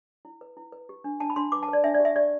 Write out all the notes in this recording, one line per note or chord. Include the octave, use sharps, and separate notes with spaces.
E4
B4
E4
B4
G4
D4
D4 A5
B5
D4 C6
B4 D6
A5
B4
D5
D4 E5
D5
G4
E5
G4 D5